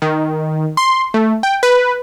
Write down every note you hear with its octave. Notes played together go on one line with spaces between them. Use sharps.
D#3
C6
A3
G5
B4